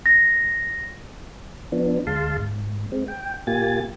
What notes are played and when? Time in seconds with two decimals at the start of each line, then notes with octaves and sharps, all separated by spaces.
0.06 A#6
1.72 F3 B3 D4
2.07 D2 G#3 F5 A5 C6
2.37 G#2
2.92 G#3 C4
3.08 G5
3.47 A#2 A#3 F4 G4 G#5 A6